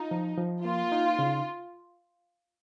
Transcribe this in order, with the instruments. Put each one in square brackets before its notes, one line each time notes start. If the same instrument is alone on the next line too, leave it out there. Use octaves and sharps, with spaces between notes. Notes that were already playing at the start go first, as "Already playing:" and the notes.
Already playing: [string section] D#4 [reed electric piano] F4
[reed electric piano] F3
F3
[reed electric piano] A#3 [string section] F4
[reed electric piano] D#4
C#3